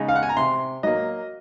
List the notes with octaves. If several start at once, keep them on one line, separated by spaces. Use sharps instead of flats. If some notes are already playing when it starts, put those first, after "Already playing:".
Already playing: C#3 G#3 D#4
F5
F#5
G#5
A#5
C3 C6
F#3 A#3 D#5